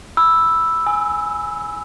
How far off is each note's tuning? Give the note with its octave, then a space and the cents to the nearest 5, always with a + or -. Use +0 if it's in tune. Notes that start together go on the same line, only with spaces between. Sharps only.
B5 +0 E6 +0
G#5 +0 E6 -30